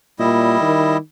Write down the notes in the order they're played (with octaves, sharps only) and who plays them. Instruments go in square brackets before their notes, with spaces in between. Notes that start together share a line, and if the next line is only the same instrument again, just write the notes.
[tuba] A#2 [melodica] G3 E4 D#5
[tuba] D#3